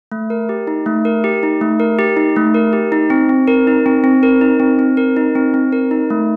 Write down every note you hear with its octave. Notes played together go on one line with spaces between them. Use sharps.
A3
A#4
G4
D#4
A3
A#4
G4
D#4
A3
A#4
G4
D#4
A3
A#4
G4
D#4
C4
C4
A#4
D#4
C4
C4
A#4
D#4
C4
C4
A#4
D#4
C4
C4
A#4
D#4
A3